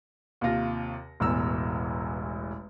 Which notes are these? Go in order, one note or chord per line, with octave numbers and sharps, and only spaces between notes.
D#2 C3 F4 A#6
E1 A1 E2 E3 A#5 E6